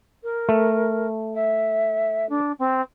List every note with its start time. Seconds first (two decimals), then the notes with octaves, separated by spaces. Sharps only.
0.23 A#4
0.49 A3
1.34 E5
2.29 D4
2.59 C4